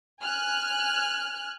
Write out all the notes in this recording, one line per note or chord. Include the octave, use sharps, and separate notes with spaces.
G#5 F6 F#6